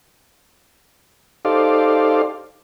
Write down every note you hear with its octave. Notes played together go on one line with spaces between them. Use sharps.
D#4 G4 A4 C5 D5 F5